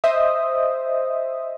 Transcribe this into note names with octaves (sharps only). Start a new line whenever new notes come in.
C5 D#5 E5 D#6